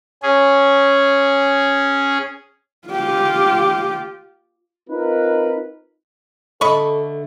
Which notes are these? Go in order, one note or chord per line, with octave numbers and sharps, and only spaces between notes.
C#4 G#4
F4 G4
C4 D#4 F4 A#4 B4
D3 A3 A4 D#5 B5 C#6